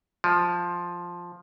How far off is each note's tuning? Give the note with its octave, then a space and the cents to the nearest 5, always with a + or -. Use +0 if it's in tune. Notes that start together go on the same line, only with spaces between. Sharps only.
F3 +5